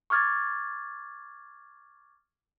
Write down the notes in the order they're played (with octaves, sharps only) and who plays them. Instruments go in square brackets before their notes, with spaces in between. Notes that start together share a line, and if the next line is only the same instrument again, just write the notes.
[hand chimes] C#6 D6 F6 G#6 A6